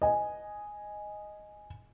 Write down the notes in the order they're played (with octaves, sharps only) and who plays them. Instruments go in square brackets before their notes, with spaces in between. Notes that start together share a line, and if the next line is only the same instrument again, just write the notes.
[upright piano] D#5 G#5